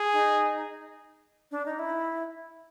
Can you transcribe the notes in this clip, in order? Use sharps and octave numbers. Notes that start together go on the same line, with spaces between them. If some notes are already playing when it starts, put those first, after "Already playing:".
Already playing: G#4
D#4
D4
D#4
E4